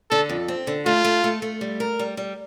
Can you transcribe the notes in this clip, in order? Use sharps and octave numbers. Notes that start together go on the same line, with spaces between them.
D3 A4
F2
C4
D3
A3 F4
A3
A3
A3
G3
A#4
G3
G3